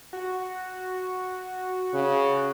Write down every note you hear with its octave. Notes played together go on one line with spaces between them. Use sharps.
F#4
C#3